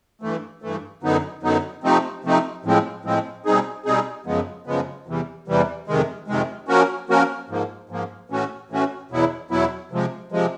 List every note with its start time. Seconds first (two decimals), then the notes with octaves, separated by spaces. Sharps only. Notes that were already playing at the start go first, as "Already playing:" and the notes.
0.22 G2 E3 A3
0.62 G2 E3 A3
1.03 F#2 D3 F#3 B3 D#4
1.43 F#2 D3 F#3 B3 D#4
1.84 C3 F3 A3 C4 D#4
2.24 C3 F3 A3 C4 D#4
2.64 A2 F3 G#3 C4
3.05 A2 F3 G#3 C4
3.46 B2 G3 C4 D#4 G#4
3.85 B2 G3 C4 D#4 G#4
4.26 F#2 C#3 F3 G#3 B3
4.66 F#2 C#3 F3 G#3 B3
5.07 E2 C3 E3 G3
5.48 E2 C3 E3 G3
5.88 F2 C3 D#3 G#3
6.28 F2 C3 D#3 G#3
6.68 F3 A#3 C#4 F#4 A#4
7.09 F3 A#3 C#4 F#4 A#4
7.49 G#2 F3 A#3
7.89 G#2 F3 A#3
8.30 A2 E3 A3 C#4 F#4
8.70 A2 E3 A3 C#4 F#4
9.11 E2 B2 F#3 B3 E4
9.50 E2 B2 F#3 B3 E4
9.92 C3 F3 G#3
10.32 C3 F3 G#3